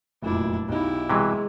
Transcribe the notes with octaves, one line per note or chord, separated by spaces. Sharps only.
F1 F#2 A#2 D4 E4
B1 D#4 E4 G4 F5
C3 E3 F#3 G#3